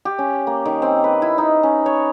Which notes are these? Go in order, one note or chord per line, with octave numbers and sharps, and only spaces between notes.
G4
C#4
A#3
D#3
C4
B4
E4
D#4
C#4
C#5